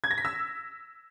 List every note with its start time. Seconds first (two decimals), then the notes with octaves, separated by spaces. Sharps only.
0.04 G#6
0.11 A#6
0.18 B6
0.25 E6